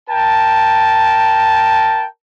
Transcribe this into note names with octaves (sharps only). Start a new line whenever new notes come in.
A#4 G5 A5